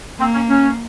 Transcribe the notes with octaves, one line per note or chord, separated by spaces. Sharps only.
A#3 C4
C#4
C#4